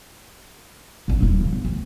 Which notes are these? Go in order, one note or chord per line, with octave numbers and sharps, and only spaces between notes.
A#1 C#4
D#1 E4
C#3
E2
D2